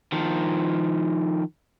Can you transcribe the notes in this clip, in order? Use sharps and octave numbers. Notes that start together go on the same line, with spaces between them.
D#3 F3